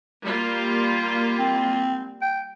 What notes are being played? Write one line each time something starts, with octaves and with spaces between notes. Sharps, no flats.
G3 A#3 F4
C4
G5